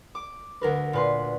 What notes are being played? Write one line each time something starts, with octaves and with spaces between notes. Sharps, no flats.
D6
D2 A#4 B4
A#2 B4 C6